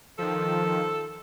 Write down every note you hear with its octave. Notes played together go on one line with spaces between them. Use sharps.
D#3 F3 A4